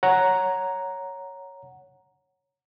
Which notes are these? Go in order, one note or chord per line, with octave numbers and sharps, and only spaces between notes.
C#5 F#5 A#5